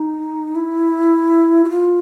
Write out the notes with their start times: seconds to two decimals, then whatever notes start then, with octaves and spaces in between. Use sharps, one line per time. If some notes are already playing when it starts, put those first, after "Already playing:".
Already playing: D#4
0.55 E4
1.65 F#4
1.69 F4